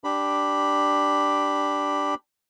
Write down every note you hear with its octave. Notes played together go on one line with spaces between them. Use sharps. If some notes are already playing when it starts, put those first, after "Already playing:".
D4 G4 B5